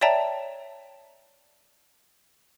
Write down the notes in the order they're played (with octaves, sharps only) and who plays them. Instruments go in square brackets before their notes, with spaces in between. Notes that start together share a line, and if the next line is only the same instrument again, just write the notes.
[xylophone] C#5 D5 E5 G5 A5 A#5